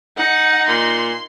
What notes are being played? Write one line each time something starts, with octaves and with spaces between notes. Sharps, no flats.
D#4 F#5
A#2 C6